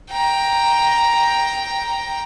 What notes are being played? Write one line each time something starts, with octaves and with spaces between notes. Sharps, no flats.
G5 A#5